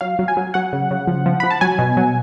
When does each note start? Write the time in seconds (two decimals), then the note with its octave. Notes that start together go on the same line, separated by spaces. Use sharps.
0.01 F#3 F5
0.19 F#3
0.28 G#5
0.37 F#3
0.54 F#3 F#5
0.73 C#3
0.91 C#3
1.07 F3
1.26 F3
1.40 F3 B5
1.50 A5
1.61 F#3 G#5
1.79 B2
1.97 F#3